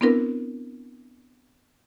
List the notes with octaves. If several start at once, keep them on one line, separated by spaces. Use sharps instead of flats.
B3 C4 D4 E4 A#4 B4